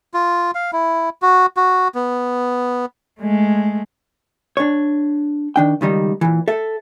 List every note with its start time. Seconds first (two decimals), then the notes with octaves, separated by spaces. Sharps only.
0.14 F4
0.55 F5
0.73 E4
1.22 F#4
1.57 F#4
1.95 B3
3.21 G#3 A3
4.57 D4 C#5
5.56 D#3 D4 G5
5.81 C#2 D#3 G3 D#4
6.21 A#2 E3
6.48 A4 E5